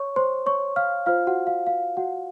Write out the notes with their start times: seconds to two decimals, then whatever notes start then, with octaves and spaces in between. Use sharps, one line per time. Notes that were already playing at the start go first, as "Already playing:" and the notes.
Already playing: C#5 C#6
0.16 C5 C6
0.46 C#5 C#6
0.76 F5 F6
1.06 F4 C5 F5 F6
1.27 F#4 F#5
1.47 F5
1.67 F5
1.97 F#4 F#5